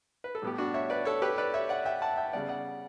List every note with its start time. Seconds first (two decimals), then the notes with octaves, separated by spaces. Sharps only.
0.24 B4
0.35 A4
0.42 A2 G3 B3 G4
0.58 D4 F#4
0.74 C#5 E5
0.90 B4 D5
1.05 A4 C#5
1.22 G4 B4
1.38 B4 D5
1.54 C#5 E5
1.69 D5 F#5
1.85 E5 G5
2.02 F#5 A5
2.17 E5 G5
2.33 C#3 G3 B3 D5 F#5
2.49 D5 F#5